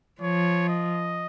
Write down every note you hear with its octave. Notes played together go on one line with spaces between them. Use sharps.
F3 C#5
D#5